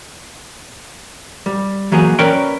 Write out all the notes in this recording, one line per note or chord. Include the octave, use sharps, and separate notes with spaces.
G3
E3 F#3 A#3 G4 G#4
C#4 A#4 B4 C#5 D5 G5